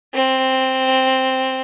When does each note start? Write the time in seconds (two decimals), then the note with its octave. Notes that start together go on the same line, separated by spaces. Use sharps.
0.14 C4